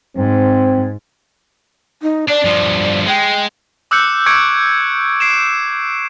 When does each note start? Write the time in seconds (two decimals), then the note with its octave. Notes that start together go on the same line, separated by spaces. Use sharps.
0.17 G#2 C4
2.02 D#4
2.28 D4 D5
2.45 G2 F3
3.07 G#3 G5
3.91 D6 E6 F#6 G6 C#7
4.26 C#6 D6 G#6 C#7 D7
5.20 C7 D7 E7